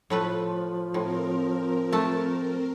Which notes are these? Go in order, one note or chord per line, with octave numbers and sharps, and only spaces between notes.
A2 F3 A3 B4
A2 C4 A#4
A3 A5